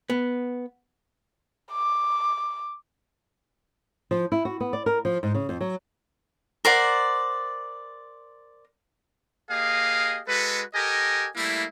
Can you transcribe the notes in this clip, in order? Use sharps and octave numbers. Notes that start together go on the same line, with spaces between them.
B3
D6
F3
E4
F#4
B3
D5
A#4
F3
G#2
C#3
F2
F#3
A#4 C5 D5 F#5
A#3 G4 G#4 D#5 F5
G#3 F#4 A4 B4
G4 A4 A#4 D#5 G#5
G3 A3 A#3 E4